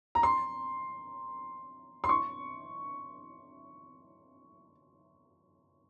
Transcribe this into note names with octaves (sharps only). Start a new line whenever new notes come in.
A#5
C6
C6
C#6